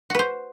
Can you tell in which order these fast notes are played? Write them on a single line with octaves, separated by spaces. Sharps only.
F#4 B4 C5